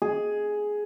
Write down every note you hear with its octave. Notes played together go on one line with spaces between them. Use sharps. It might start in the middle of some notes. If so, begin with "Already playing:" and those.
G#4